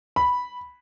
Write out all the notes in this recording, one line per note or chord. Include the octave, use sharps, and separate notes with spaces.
B5